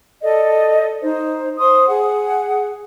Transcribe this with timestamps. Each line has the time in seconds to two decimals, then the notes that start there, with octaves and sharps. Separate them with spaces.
0.23 A4 D5 D#5
1.01 D#4 C5
1.58 C5 C6 D#6
1.88 G#4 F#5